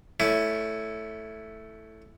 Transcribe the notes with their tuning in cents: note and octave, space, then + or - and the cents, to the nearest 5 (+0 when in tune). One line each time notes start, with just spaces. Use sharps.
A3 +0 C#4 +20 E4 +0